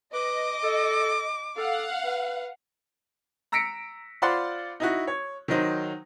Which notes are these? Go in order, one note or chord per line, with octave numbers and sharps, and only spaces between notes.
B4 D#5 D6
A4
A4 F5 F#5
B4
A#5 E6 A#6 B6 C#7 D7
F4 C5 D5 F#5 B5 C6
D#4 E4 F#4
C#5
D#3 F#3 D#4 C5